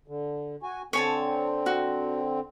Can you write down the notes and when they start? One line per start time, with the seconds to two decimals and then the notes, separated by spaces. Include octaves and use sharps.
0.08 D3
0.63 F#4 G#5
0.93 D3 C4 C#5 G#5 A5
1.66 F#4